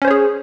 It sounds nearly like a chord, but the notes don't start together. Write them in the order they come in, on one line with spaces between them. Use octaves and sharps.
C#4 C5 C#5 G#4